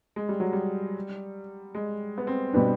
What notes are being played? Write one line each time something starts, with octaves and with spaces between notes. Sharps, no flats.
G#3
G3
F#3
G3
G#3
B3
C4
B2 G3 B3 D4